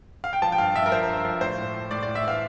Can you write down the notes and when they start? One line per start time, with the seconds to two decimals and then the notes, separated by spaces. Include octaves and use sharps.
0.24 F5
0.33 G5
0.42 F3 A5
0.52 G5
0.58 G2 F5
0.75 G2 E5
0.86 A#4
0.92 F3 C5
1.08 G2
1.25 F3
1.41 A2 C5
1.58 A2
1.74 A2
1.91 A2 D5
2.03 D5
2.07 A2
2.15 E5
2.24 E3 F5